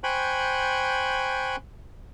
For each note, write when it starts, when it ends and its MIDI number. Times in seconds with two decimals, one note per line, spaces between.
0.03 1.56 72
0.03 1.56 79
0.03 1.56 80
0.03 1.56 83
0.03 1.56 85
0.03 1.56 90